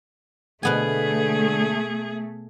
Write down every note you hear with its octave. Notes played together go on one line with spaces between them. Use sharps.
B2 D3 A3 B3 G#4 G#5